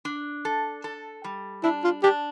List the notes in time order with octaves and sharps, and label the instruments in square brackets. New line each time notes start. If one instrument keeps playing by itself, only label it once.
[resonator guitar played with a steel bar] D4
A4
A4
G3
[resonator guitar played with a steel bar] D4 [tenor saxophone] E4
[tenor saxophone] F4
[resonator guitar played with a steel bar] D4 [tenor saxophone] G4